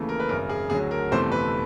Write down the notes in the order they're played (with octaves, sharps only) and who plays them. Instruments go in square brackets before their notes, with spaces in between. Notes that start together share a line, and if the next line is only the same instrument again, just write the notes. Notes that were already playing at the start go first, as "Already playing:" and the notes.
Already playing: [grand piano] D#2 C#3 E3 A3
A#4
B4
G#1 F#2 C#3 A#4
G#4
D2 D3 F#3 G#4
A#4
G1 F2 C3 E3 A3 C5
B4